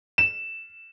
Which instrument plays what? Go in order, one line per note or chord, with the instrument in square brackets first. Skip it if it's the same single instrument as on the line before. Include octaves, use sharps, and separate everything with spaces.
[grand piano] E7